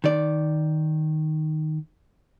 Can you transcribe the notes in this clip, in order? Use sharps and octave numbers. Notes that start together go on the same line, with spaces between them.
D#3 D5